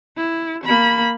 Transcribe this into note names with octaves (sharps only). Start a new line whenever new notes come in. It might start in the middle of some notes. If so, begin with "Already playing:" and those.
E4
A#3 B5